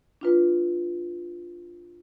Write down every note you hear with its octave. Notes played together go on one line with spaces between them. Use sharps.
D4 F4 B4